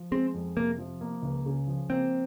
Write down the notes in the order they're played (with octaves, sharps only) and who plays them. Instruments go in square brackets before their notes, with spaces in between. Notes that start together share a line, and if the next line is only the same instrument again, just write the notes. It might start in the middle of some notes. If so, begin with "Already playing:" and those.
Already playing: [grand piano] F3
[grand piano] G#3 [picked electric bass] C4
[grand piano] F2
[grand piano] C3 [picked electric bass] A#3
[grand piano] F3
A#3
C#2
C#3
F3
[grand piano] A#3 [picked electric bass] C4